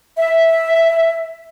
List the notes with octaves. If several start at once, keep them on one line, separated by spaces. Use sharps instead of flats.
E5